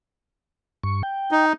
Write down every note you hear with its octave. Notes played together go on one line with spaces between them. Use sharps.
G2 C#6
G5
D#4